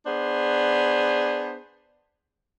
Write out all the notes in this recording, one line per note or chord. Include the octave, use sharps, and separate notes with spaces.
B3 D4 G#4 C5